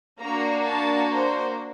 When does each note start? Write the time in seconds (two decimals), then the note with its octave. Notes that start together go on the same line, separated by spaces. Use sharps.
0.20 A#3 D4 F#4 A#5
0.66 A5
1.11 C5